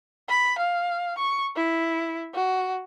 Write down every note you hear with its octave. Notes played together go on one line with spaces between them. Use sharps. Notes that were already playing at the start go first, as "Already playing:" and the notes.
B5
F5
C#6
E4
F#4